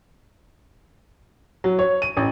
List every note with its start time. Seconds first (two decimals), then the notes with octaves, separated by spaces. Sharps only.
1.64 F#3
1.79 C#5
2.02 D#7
2.17 A1